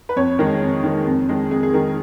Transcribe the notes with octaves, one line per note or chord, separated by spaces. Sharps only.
B4
F2 C#5
D#3 G#3 A#4
F2
D#3 G#3
F2
D#3 G#3
F2 G#4
G#4
D#3 G#3 A#4